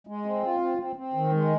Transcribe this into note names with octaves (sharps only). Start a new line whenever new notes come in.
G#3
C4
F4
C4
C4
C4
D#3
G#3